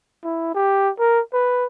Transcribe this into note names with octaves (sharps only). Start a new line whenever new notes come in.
E4
G4
A#4
B4